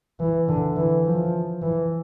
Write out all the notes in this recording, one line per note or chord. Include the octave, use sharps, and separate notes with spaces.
E3
D3
E3
F3
E3